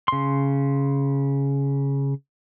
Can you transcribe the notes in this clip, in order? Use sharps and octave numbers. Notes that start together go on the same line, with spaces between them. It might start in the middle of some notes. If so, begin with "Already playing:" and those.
C#3 C6